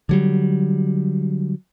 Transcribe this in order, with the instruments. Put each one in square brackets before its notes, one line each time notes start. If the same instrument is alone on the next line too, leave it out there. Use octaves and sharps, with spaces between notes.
[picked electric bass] D3 F#3 G3